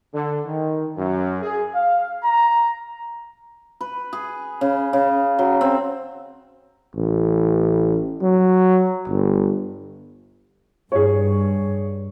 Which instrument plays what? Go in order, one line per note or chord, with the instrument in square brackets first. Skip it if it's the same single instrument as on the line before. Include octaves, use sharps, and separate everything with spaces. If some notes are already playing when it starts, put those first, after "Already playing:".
[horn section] D3
D#3
F#2
G#4
F5
A#5
[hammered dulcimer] B4
G#4
C#3
C#3
F#3
C4
[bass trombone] A1
F#3
G1
[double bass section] G2 [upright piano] G#4 C#5